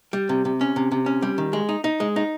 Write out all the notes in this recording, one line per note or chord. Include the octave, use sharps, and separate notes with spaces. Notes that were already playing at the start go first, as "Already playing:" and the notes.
G3
C3
C3
C#4
C3
C3
C#4
G3
D#3
G#3
D#4
D#4
G#3
D#4